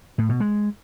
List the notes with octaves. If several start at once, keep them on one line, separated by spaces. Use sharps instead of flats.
A2
B2
G#3